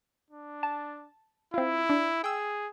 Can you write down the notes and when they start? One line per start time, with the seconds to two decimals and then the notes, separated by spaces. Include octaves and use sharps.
0.31 D4
0.63 A5
1.54 C4 E4 F4
1.90 D4
2.24 G#4 G5 E6